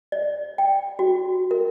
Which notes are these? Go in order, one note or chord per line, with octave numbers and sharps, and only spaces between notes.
D5
G5
F#4
A#4